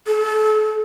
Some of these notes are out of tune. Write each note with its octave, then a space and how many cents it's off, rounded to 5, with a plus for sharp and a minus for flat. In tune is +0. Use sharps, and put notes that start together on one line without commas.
A4 -35